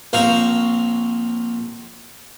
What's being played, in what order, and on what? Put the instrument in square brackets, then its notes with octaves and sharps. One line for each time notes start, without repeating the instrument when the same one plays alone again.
[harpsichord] A#1 C4 A#4 C5 C#5 F5